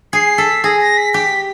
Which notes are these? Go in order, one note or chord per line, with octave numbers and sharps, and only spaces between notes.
G#4 C7
A4 B6
G#4 A#6
A#6
B6
G4 B6